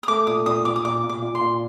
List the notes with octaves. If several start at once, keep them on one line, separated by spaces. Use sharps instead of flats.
D#6
A3 D6
A#2 D#6
A#2 D#6
A#2 D6
D#6
A#2 D6
A#2
D6
A#2
C6
A#2